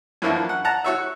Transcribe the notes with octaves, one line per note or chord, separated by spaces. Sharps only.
F#2 E3 F3 A#3 D4 E4
F#5
F#5 A5 A#5
F#4 C#5 E5